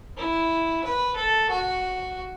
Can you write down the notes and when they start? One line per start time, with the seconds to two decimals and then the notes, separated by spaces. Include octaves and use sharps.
0.18 E4
0.84 B4
1.16 A4
1.50 F#4